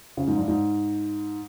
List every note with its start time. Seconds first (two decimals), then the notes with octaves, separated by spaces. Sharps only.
0.17 C#3
0.27 G#2
0.37 G2
0.48 G#2